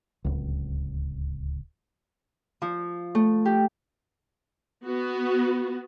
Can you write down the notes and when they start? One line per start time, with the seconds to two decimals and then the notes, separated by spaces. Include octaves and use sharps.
0.24 D1 C#2
2.62 F3
3.15 A3
3.45 G4
4.86 B3 F#4